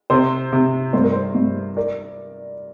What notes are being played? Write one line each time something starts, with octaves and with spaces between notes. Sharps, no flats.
C3 C5
C3
G2 C5
A#4
C5
G2
A#4 D5